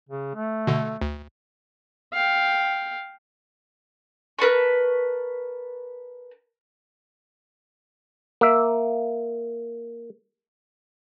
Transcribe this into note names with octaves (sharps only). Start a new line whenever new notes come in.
C#3
A3
B2 D3
D2
F5 G5
A#4 B4 A5 C#6
A#3 E5